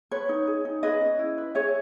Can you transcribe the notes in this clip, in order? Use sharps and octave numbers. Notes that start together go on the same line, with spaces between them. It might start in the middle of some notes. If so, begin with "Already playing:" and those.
B4 C#5
D#4
G#4
D#4
G#4 B4 D#5
C#4
E4
B4
G#4 C#5 E5